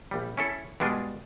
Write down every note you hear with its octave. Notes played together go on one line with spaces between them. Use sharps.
A#1 G3
C#4 E4 A4
G2 B2 G#3 D4 F4